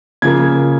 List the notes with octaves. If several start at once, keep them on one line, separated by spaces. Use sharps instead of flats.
C#3 F3 A#3 G#6